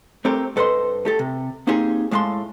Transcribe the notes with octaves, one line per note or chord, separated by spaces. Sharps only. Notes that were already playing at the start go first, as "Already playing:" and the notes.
A3 C4 G4 A#4
G2 A4 B4 C5 D#5 C6
A3 G4 A4
C3
A#3 C4 D#4 G4 G#4
A2 G#3 F5 A5 C6